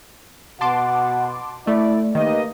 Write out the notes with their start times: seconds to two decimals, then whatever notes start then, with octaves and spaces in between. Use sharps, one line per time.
0.61 B2 F#5 A5 C6 D6
1.67 A3 E4 D5
2.15 D#3 A#3 G4 B4 D#5